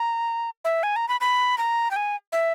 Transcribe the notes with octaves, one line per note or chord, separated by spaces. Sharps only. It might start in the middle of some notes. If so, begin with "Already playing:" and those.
Already playing: A#5
E5
G#5
A#5
B5
B5
A#5
G5
G#5
E5